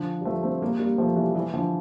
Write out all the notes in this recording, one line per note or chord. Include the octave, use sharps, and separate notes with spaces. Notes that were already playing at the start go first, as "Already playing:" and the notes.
Already playing: D3 F3
G3
F3 A3
A3 C4
G3 A#3
G3 A#3
F3 A3
E3 G3
E3 G3
D3 F3